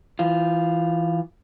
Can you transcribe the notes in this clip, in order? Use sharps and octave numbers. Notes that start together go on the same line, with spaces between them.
E3 F4